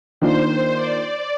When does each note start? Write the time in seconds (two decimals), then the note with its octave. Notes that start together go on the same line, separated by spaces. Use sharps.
0.21 D#3 A#3 D4 F4 C5
0.76 D5